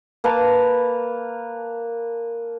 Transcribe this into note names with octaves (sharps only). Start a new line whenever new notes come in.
A#3 B4 A5 A#5